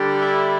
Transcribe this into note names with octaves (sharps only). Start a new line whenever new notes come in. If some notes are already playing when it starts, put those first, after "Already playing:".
Already playing: D3 G3
E4